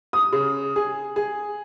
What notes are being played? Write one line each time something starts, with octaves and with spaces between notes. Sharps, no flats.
D#6
C#3
G#4
G#4